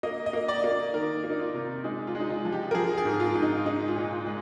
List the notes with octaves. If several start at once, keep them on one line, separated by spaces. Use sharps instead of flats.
A#3 D#5
D#5
A#3
D5
A#3
D#3 A#4
A#3
D#4
F4
C3
G#3 D#4
F4
G#3
D#4
F4
F3
G4
A#4
F3 G#4
G#4
G#2
F4
G#2
D#4
G#3 D#4
F4
A#2
F4
G#3